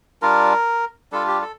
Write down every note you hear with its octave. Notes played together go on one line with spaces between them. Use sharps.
G3 D4 F4 A#4
G3 D4 F4 A4
G4
A4